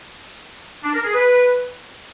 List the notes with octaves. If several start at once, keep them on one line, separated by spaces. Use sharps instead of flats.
D4
A#4
G#4
B4